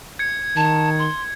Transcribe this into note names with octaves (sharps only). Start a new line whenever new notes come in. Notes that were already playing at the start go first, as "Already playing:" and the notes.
G#6 C#7
D#3 A5
C6